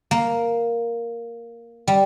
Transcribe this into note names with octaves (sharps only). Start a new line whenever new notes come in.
A#3
G3